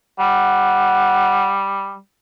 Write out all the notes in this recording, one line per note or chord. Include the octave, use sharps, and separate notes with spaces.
G3 F#5